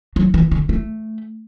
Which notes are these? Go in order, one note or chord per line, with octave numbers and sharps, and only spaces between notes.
F#3
E3
D3
A3